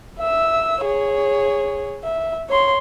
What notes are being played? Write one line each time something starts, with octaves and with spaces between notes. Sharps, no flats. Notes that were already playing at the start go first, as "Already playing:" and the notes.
E5 E6
G#4 C#5
E5
C#5 C6